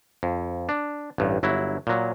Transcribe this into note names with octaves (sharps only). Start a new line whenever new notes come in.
F2
D4
A1 G2
G1 F#3 E4
A#2 F#3